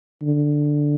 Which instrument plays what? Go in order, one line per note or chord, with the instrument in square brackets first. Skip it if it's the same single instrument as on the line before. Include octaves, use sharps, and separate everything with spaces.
[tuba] D3